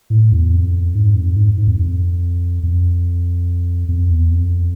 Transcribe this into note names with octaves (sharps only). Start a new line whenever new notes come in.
A2
E2
F2
G#2
F2
G#2
G#2
F2
F2
F2
F2
E2
F2